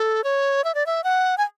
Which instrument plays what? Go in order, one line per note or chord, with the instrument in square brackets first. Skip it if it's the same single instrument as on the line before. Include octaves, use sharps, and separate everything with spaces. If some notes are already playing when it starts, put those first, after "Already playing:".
Already playing: [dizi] A4
C#5
E5
D5
E5
F#5
G#5